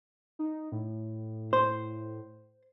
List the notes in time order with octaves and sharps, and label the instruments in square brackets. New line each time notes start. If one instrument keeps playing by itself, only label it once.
[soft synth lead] D#4
A2
[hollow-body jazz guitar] C5